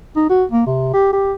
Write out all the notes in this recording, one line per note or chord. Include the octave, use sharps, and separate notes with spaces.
D#4
F#4
A#3
C3
G4
G4